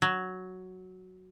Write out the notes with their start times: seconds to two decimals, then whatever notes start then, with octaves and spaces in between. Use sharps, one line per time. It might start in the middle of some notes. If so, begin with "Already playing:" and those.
0.02 F#3